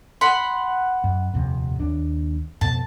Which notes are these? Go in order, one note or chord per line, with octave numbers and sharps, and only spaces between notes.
F#5 B5 C6
F#2
D#1 F2 C3
D#2 D4
F2 B2 B3 A5